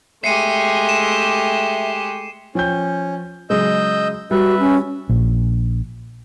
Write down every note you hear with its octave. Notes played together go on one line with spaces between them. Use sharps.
G#3 A3 G4 E5 G5 C7 C#7 D#7
E7
F3 C#4 G5 G6
C#3 F#3 G#3 D#5 E6 G6
G3 F#4 B4 E5
C#4
A#1